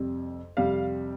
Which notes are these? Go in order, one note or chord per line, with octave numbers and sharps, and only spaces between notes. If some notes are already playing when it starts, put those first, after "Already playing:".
Already playing: F2 C3 G3
F2 C3 G3 F5